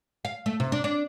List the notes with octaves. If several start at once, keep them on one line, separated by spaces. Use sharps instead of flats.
F5
A3
C3
D4
D4